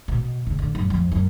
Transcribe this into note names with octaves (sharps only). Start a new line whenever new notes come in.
B2
C#3
D3
F#2
F2
F#2